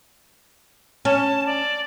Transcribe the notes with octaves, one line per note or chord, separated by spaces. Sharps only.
C#4 A5
D5